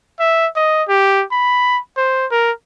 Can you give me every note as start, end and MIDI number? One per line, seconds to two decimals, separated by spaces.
0.20 0.48 76
0.56 0.83 75
0.88 1.24 67
1.32 1.79 83
1.97 2.26 72
2.31 2.51 70